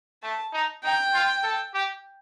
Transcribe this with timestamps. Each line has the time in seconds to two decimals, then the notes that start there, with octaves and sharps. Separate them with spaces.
0.23 A3 A5
0.53 D#4
0.83 D#4 G5
1.14 F4
1.44 A4
1.74 G4